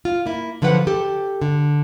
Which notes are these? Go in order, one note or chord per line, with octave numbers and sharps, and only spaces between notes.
F4
A#3 E4
D3 F3 F#3 B4 F#5
G4 A4
D3